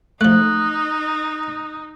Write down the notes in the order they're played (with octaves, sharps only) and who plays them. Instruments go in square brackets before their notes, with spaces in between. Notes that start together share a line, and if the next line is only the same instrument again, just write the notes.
[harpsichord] F3 A3 [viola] D#4 [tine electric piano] F#6